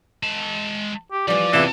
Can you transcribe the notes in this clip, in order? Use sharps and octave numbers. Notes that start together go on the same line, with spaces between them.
G#3 A5
G4
E3 F3 G3 D5
E2 C3 E3 F4 C#5 A5